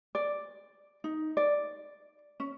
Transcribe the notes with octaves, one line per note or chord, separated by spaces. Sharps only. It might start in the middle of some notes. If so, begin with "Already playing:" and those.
D5
D#4
D5
C#4